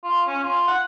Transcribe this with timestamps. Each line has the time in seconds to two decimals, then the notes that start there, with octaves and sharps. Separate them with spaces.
0.04 F4
0.27 C#4
0.43 F4
0.67 F#5